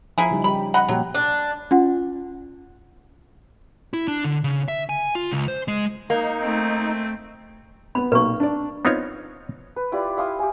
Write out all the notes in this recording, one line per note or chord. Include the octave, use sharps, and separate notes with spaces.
F3 A#3 E4 G#4
C#3 G3 D#4
G3 C#4 G4 B5
D#5 F#5 B5
A#2 F3 F#3 G4
D4
C#4 F4 F#5
E4
D4
D3
C#3
E5
G#5
F4
C#2
C5
G#3
A#3 D#4
A3 C4
B3 B4 B5
B1 A#2 B4 C#6
D4 D5
B3 C4 D#4 F4 C#5
B4
E4 F4 G4 D5
E5 F5 C6 D#6
G4 G#5